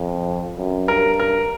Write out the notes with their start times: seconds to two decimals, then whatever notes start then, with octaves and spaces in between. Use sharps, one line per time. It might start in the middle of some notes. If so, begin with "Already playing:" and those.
Already playing: F2
0.58 F#2
0.88 G2 A#4
1.20 A#4